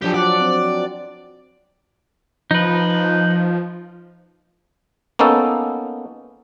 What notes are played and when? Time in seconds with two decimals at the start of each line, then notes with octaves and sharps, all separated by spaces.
0.02 F3 F#3 D4 G4 A4
0.14 D5 F#5
0.40 C4
2.51 F3 D#4 B4
5.19 A#3 B3 C#4 D#4 A4